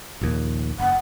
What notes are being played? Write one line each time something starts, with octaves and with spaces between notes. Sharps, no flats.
A#1 D#2
F#1 F#5